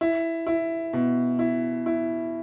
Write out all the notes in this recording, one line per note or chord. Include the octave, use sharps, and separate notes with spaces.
E4
E4
B2
E4
E4